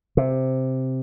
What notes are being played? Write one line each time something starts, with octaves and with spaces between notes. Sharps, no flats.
C3